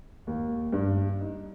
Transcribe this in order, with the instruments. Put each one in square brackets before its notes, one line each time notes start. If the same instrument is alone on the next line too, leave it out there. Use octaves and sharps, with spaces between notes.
[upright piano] D#2
G2
D#4